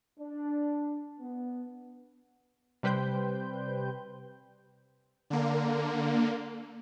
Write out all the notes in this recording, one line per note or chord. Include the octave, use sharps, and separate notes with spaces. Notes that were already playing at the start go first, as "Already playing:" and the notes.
D4
B3
C3 G3 B4 C5 G5 G6
D3 A#3